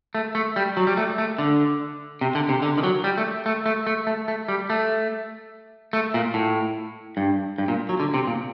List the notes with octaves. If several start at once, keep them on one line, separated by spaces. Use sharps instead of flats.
A3
A3
G3
F#3
G3
A3
A3
D3
C3
D3
C3
D3
D#3
F#3
G3
A3
A3
A3
A3
A3
A3
G3
A3
A3
A#2
A2
G2
G2
A#2
F#3
D3
C3
A#2